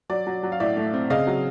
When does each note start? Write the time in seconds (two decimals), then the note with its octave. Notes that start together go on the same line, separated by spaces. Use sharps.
0.10 F#3 D5
0.27 F#3
0.43 F#3
0.52 F5
0.60 A2 D5 E5
0.77 A3
0.93 C4
1.10 C#3 D#5 F5
1.27 F#3